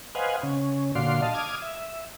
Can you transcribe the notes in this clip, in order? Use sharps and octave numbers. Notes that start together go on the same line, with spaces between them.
B4 C5 D#5 F5 F#5 G#5
C#3 C#4
A#2 D3 F#4 D5 F5 C6
D#5 F5 A5
D6 D#6 F6 G#6
E5